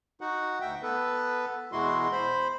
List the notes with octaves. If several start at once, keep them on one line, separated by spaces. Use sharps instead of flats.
D#4 F#4 F#5
D2 E5 G5
B3 A4 B4
E2 B2 G#3 E4 F#4 C6
C5 B5